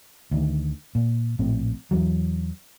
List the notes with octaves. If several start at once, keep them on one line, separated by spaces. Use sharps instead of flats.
D2 D#3
A#2
A#1 A2 C4
E2 E3 F#3